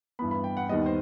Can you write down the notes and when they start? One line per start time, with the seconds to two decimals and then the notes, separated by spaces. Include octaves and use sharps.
0.19 G2 E3 B3 B5
0.31 B5
0.44 G5
0.57 F#5
0.69 D#2 D#3 G3 B3 D#5
0.86 C5